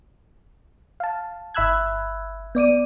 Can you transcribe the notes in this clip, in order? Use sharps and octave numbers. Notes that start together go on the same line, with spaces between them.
F5 A5
G1 E5 B5 E6 F#6 G#6
B3 D5 D6 D#7